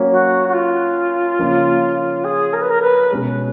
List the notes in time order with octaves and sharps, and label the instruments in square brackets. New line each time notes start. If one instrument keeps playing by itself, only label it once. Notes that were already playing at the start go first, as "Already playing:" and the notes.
Already playing: [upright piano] F#3 A#3 C#4
[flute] F#4
F#4
F4
[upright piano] C#3 F3 A#3 C#4
[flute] G#4
A#4
B4
A#4
B4
[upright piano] B2 G#3 C#4 G#4 C#5